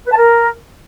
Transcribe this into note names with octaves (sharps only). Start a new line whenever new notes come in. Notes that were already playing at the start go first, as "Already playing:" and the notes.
B4
A5
A#4